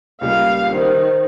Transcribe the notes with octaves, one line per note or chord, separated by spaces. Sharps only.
C#2 A#2 G3 F5
D#3 C5